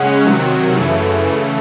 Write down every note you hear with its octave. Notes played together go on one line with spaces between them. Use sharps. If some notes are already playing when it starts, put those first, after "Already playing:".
Already playing: C#3 G#3 C#4 F#5
C3 D#3 F#3
F#2 C#3 E3 A3
C#3 E3 A3